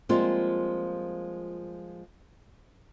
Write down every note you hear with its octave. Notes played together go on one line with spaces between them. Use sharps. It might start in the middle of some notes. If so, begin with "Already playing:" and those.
F3 G3 G#3 A#3 C4 F4